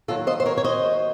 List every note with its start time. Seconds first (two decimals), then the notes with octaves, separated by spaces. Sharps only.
0.08 D#2 D#3 F#3 F4 A4
0.27 C5 D#5
0.40 C5
0.46 A#4 C#5
0.57 C#5
0.64 C5 D#5